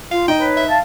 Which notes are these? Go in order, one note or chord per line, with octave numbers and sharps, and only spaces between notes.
F4 F5
D#4 D#5 G5
B4 C#5
E5
F5 A5